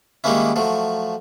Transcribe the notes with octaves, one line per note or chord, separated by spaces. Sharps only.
D#3 G3 G#3 A#3 C#4 E4
F3 F#3 A3